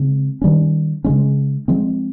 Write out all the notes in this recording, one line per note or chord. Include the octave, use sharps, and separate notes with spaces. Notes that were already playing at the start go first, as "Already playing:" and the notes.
Already playing: C#3 G#3 C4
D#3 G3 C#4
C#3 G#3 C#4
F3 G#3 C4